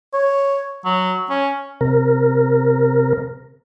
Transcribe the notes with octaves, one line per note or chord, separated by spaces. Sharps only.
C#5
F#3
C#4
C3 A#4